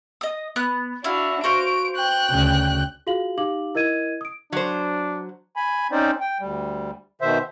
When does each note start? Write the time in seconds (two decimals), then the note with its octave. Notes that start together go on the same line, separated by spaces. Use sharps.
0.21 D#5 D#6
0.56 B3 F#6
1.04 D4 E4 F#4 F5
1.44 F#4 C5 F5 D7
1.96 G5 F#6
2.30 D2 C#3
3.07 F4 F#4 G#4 F5 F#7
3.38 D#4 G4 F5 D6 F#7
3.75 E4 A#4 D#5 G#6 D#7
4.21 D#6 D7
4.53 F#3 D4 C5
5.56 G#5 B5
5.92 C4 C#4 D#4 C5 D5
6.20 G5
6.40 D2 G3
7.21 B2 D#3 C5 E5